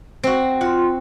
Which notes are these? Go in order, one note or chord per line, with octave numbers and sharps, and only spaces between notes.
C4 F#4
F4 F#5 C6